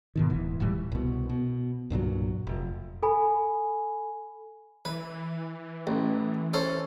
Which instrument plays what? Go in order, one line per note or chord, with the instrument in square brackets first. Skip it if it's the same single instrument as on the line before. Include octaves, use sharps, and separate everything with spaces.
[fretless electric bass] G#2 B2 D#3
D1 E3
D1 A2 E3 G3
[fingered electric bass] C2 B2
B2
C2 G2 A#2 F#3
F1
[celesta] A4 G#5 B5
[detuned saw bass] E3 [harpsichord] B4
[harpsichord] A1
C#4 A4 C5